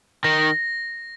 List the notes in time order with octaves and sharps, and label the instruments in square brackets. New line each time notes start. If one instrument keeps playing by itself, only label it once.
[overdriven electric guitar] D#3 [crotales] A#6